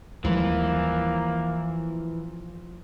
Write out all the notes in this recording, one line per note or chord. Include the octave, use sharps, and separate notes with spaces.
D#2 E3 F3 G3 G#3 A#3